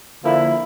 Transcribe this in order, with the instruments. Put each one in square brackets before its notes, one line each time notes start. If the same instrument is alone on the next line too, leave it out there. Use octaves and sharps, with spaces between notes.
[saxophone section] D3 F3 A#3 E4